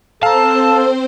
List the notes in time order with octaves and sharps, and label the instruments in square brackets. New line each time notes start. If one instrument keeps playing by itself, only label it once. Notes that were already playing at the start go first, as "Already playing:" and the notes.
[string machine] C4 C5 [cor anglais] A4 [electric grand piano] F5 A#5 [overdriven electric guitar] A5